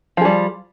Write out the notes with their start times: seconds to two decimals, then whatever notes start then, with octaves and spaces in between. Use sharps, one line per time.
0.17 F3
0.21 G#4
0.25 G3